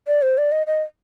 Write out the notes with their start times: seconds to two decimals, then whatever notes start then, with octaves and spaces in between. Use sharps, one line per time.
0.07 D5
0.22 C5
0.38 D5
0.52 D#5
0.67 D#5